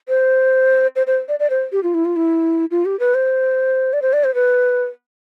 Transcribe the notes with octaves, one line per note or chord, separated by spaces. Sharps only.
C5
C5
C5
D5
D5
C5
G4
F4
E4
F4
E4
F4
G4
B4
C5
D5
C5
D5
C5
B4